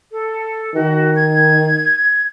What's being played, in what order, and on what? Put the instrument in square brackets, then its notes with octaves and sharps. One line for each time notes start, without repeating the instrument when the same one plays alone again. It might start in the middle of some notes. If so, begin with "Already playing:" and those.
[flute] A4
[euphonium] D#3 [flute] F#4
[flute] G#6